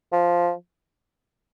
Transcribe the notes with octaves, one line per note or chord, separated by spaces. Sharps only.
F3